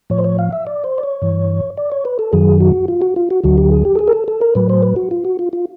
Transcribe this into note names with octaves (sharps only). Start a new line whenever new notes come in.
A2 F3 C#5
C5
C#5
F5
E5
D5
C5
D5
C#5
G2 E3
D5
C#5
B4
A4
F#2 D#3 F#3 G#4
F#4
F4
F#4
F4
F#4
D2 D3 F#3 F#4
G4
G#4
G4
A4
G#4
A#4
A4
A4
A#4
A2 F#3 B4
C5
B4
F#4
F4
F#4
F4
F4